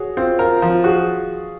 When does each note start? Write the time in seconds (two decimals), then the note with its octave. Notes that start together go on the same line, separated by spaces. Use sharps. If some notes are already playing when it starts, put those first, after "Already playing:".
Already playing: F#4 G#4 C#5
0.17 C4 F4
0.39 F4 A#4
0.62 F3 F4
0.84 F#4 G#4